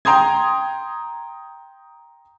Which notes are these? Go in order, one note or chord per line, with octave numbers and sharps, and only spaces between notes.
G5 A#5 C6 D#6 G#6